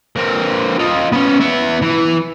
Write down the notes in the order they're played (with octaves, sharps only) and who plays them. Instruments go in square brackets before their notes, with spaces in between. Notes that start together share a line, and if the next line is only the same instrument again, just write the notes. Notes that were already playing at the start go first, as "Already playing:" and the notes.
[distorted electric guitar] A#3 C4
F4 D#5
B3 C#4
B3 E4
E3